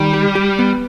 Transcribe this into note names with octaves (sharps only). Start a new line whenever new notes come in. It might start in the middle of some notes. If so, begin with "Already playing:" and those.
Already playing: D#3 G3
G4
G4
B3